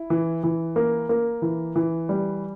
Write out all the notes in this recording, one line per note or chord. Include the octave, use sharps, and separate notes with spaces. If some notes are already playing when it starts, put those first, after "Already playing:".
Already playing: E4
E3
E3
A#3
A#3
E3
E3
G3